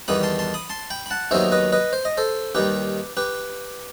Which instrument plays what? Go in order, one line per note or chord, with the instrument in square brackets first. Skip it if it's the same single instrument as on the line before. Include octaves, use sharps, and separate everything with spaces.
[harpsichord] E2 D#3 G3 B3 B5 D#6
A5 C6
A5 C6
B5 D#6
A5 C6
G5 B5
B5
F#5 A5
D#2 D#3 F#3 B3 D#4 C5 E5
B4 D#5
B4 D#5
C5
D#5
A4 C5
D#2 D#3 G3 G4 B4
G4 B4